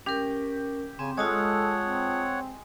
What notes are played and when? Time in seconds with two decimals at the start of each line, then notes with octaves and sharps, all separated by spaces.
0.06 C#4 G4 A#4
0.99 C#3 C4 G#5
1.17 G#3 F4 A4 C#5 F#5 A5 D#6
1.81 C4